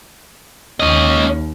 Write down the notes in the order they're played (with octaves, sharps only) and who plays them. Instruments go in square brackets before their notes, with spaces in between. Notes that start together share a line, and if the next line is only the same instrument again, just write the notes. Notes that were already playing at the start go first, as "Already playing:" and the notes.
[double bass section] D#2 [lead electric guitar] C#4 D#5